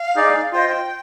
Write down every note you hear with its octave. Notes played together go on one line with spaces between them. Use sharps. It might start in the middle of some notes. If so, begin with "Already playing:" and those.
Already playing: F5
D#4 G#4 D5
F4 C5 D#5 G5